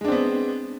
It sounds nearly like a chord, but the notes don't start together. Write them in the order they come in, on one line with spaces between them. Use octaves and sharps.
G#3 D4 C4 B3